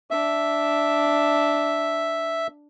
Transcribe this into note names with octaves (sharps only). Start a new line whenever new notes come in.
D4 E5